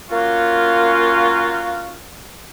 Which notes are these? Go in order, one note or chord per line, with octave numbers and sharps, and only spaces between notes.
A#3 C#4 F4 F#4